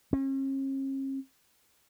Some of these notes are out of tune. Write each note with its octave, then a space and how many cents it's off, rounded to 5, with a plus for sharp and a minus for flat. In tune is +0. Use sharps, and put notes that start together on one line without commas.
C#4 -45